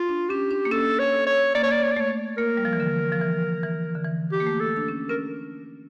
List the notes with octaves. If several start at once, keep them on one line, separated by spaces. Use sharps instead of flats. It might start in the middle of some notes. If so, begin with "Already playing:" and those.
Already playing: F4
D4
C#4 G4
D4
A#3
C#4 A4
C#5
C#5
A#3 D5
C#5
D5
C#5
D5
A3 C#5
A#3 A#4
G3
F3
E3
D3
F3
E3
E3
D3
E3
G4
A#3
A3
A4
D4
C#4
C#4 A#4